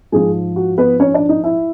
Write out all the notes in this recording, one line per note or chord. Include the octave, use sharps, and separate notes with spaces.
G#2 F3 G#3 G#4
F#4
B3 B4
C#4 C#5
D4 D5
D#4 D#5
E4 E5